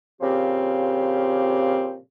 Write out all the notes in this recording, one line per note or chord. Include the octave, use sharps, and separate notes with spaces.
A#2 C#3 F3 C4 G4